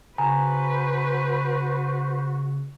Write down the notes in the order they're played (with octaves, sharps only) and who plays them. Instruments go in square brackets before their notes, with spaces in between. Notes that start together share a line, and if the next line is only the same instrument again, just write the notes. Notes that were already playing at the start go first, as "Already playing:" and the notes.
[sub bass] C#3 [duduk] F#4 [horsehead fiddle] B4 C5 [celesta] G#5 A#5